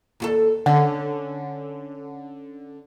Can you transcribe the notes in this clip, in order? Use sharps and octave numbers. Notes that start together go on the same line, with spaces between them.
D#2 F4 A4
D3 C#4